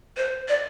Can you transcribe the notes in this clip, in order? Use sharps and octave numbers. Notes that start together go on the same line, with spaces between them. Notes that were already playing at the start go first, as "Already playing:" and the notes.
C5
D5